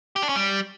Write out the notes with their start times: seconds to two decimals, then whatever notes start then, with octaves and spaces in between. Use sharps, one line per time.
0.16 G4
0.22 D4
0.29 C#4
0.36 G3